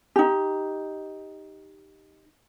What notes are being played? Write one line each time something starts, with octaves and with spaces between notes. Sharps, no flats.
D#4 G4